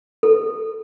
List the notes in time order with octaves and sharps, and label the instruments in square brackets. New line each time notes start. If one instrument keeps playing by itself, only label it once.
[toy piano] A4